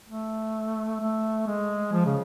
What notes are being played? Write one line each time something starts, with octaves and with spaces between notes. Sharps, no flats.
A3
A3
G#3
F3
C#3